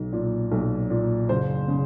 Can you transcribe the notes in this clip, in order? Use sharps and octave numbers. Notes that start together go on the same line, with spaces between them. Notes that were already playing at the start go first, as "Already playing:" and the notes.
Already playing: B1
A#2
B1
A#2
F#1 C5
C#3